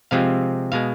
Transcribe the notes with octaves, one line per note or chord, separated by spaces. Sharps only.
C3 F3 G#3 C4 F4 F5
B2 G#3 F5